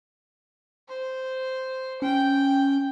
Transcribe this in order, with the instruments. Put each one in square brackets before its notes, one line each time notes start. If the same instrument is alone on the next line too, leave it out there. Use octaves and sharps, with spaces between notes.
[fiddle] C5
[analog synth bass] C#4 [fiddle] G5